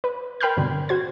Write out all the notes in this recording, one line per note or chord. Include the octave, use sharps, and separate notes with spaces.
B4
A#4 G5 B5 C6 F6 G6
G2 B2 D3 C4
F#4 C5 G#6